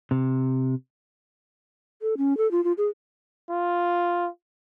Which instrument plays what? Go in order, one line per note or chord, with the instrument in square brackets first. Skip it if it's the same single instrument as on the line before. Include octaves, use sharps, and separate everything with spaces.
[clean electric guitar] C3
[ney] A4
C#4
A4
F4
F4
G#4
[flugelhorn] F4